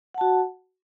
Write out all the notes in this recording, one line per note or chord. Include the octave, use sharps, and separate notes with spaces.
F#4 F#5 A5